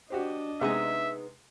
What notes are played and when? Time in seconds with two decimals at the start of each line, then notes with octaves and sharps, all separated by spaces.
0.10 D4 F#4 G4 C5 D#5
0.61 C3 G#3 B3 D#4 G#4 E5